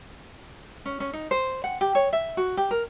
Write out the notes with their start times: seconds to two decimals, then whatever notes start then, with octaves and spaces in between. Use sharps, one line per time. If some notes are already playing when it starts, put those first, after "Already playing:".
0.85 C#4
1.00 C#4
1.13 D#4
1.31 C5
1.64 F#5
1.81 G4
1.95 C#5
2.13 E5
2.37 F#4
2.57 G4
2.71 A#4